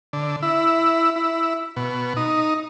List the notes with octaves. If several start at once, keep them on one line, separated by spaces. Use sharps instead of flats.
D3
E4
E4
B2
D#4